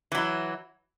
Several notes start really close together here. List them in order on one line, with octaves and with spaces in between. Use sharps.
E3 F#3 E4